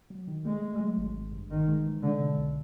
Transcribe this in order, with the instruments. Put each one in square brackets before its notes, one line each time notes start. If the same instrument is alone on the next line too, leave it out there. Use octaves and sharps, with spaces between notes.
[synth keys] F#3
D#3
[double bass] G#3 [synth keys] A3
[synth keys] A3
F#3
G#1
G#1
G2
[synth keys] G#1 [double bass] D#3
[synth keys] G#3
E3
[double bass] D3 [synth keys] G#3
[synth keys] B2
B1